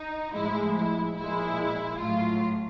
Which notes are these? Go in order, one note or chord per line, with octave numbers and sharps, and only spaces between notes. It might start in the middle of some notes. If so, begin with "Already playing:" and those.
Already playing: D#4
A2 F3 G#3 E4
E4
A#2 F3 G#3 E4
A2 F#3 F4